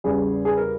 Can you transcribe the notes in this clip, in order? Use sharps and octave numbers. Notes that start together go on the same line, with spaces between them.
E2 C#3 G3 G#4
G#4
A#4